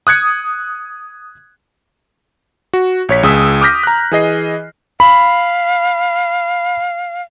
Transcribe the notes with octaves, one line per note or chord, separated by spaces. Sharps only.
D#6 F#6 G#6 C#7
F#4
A#1 C#5 B6
C#2 G#4 D#6 E6
D6 D#6 F6 G6 A#6 B6
A#5 F#6
E3 G#4 D#5 C7
F5 B5